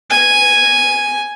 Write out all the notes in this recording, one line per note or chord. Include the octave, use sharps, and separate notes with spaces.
G#5